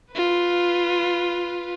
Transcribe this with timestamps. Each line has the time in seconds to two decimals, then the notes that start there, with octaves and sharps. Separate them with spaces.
0.13 F4 B4